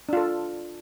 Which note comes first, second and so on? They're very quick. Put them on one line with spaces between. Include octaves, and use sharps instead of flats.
D4 F4 A4